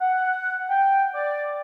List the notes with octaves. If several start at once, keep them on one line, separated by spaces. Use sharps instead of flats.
F#5
G5
D5